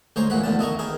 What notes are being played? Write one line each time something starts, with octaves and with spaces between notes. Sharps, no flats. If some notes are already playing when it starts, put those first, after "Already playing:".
D2 G#3 C5 C#5 A#5
A#2 E3 F#5 B5
E2 D3 D#3 A5
E4 D#5 A#5 C#6
D#3 G#4 A#4